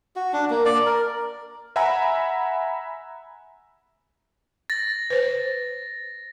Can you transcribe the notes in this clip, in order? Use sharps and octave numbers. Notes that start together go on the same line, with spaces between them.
F#4
D4
A#3
D5
A#4
E5 F#5 G#5 A#5 B5 E6
A6 A#6
B4 C5